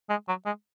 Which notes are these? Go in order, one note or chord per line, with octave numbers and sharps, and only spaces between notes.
G#3
F#3
G#3